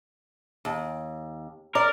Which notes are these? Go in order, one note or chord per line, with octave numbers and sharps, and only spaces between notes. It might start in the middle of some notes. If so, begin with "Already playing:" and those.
D#2
A#4 D5